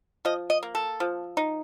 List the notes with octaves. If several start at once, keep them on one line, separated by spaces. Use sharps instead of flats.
F3 D#5
D#5
A#3
A4
F3
D#4